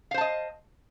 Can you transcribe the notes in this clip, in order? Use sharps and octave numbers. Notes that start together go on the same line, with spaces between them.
C5 D#5 F5 A5